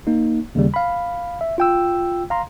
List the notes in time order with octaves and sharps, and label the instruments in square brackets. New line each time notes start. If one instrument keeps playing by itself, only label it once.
[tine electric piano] A#3 D#4
D#2 C#3 G3
F5 B5
E5
F4 G5 E6
F5 A#5 C6